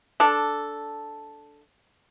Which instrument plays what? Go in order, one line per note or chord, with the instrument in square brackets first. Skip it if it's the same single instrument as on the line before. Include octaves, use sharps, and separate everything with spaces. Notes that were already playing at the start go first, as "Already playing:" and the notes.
[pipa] D4 A4